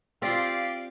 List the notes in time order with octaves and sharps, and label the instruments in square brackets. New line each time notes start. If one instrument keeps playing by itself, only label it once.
[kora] C4 F4 [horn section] G4 D5 F5